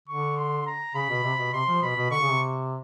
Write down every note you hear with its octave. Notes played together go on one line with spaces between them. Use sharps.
D3 C#6
C6
A#5
C#3 B5
B2
C3
B2
C3 C6
F3
B2 B5
B2
D3 C#6
C#3
C3